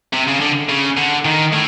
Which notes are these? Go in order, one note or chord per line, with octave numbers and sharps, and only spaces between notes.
C3
C#3
D3
C#3
D3
D#3
A2